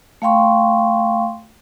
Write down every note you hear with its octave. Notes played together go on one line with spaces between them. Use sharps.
A3 F5 G5 C6 C#6